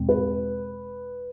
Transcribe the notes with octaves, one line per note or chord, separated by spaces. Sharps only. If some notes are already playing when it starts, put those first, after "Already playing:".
Already playing: E2 B2 G#3 C4
B4